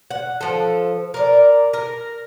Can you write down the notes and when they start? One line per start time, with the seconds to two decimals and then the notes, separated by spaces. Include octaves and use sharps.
0.11 F#5
0.41 F3 A4
1.14 A#4 D5
1.73 A#4